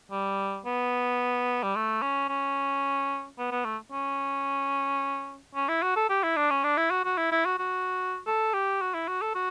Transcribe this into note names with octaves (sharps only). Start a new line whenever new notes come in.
G3
B3
G3
A3
C#4
C#4
B3
B3
A3
C#4
C#4
E4
F#4
A4
G4
E4
D4
C#4
D4
E4
F#4
F#4
E4
E4
F#4
F#4
A4
G4
F#4
E4
F#4
A4
F#4